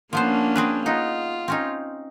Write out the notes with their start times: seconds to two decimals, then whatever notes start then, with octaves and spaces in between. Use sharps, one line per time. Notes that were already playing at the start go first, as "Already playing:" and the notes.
0.13 F3 A#3 B3 C#4 D4 C5
0.56 C4 G#4 B4
0.86 B3 D#4 F4
1.48 C4 C#4 D#4